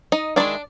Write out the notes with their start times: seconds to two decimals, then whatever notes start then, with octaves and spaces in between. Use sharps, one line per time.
0.12 D#4 D#5
0.36 D#3 G#3 C4 D4 E4 D5